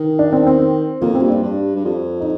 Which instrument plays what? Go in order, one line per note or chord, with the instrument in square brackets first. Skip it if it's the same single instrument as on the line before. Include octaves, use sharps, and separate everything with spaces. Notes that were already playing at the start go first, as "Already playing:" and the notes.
Already playing: [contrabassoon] D#3
[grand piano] D4
C4
C4
[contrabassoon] F2 [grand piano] A#3
[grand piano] C4
[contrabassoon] G2
[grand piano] D4
[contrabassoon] G2
G2
F2
[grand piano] D#4